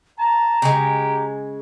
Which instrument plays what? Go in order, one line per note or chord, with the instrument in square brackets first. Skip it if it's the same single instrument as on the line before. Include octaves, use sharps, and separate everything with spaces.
[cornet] A5 [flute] A#5
[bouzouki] C#3 G#3 [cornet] G4